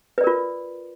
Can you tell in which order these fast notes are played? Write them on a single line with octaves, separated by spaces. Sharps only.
B4 D5 A#4 F4